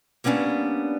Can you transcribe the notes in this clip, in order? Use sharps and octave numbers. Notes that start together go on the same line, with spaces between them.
G3 A#3 B3 C#4 D4